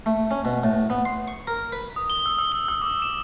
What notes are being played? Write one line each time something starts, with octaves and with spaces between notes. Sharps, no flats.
A3
C#4
B2
A2
B3
C6
C#6
A#4
B4
D#6
G7
E6
E6
G7
E6
D6
E7